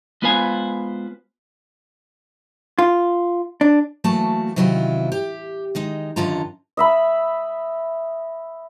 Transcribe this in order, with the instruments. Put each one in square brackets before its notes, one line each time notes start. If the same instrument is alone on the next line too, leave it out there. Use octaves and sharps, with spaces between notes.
[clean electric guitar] G#3 B3 F4 B4 C5 G#5
[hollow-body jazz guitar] F4
D4
[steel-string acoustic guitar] E3 F#3 A3 A#3 F#4 A5
C3 D#3 F#3 C#4 E4 F4
G4
D#3 G#3 D#4
F#2 D3 D#3 F4 A5 A#5
[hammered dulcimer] D#5 E5 B5